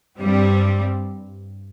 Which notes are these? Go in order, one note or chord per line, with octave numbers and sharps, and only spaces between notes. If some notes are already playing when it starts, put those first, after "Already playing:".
G2 G3 C4